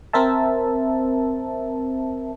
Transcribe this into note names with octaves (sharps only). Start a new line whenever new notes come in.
C4 A#4 C5 E5 A5